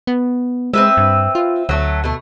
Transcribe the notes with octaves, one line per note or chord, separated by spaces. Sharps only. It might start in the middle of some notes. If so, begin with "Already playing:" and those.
B3
G#3 C4 B4 E5
G2
F4
D2 F#3 A3
B2 A3